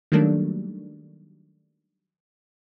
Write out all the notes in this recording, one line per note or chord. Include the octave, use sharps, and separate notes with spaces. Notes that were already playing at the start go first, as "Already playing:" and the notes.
D#3 F#3 G3 A3 A#3 D4